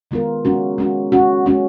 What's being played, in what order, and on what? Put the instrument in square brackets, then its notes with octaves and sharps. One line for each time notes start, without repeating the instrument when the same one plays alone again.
[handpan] D#3 G#3 B3 F4 A#4
G#3 C#4 F#4
G#3 C#4 F#4
G#3 C#4 F#4
G#3 C#4 F#4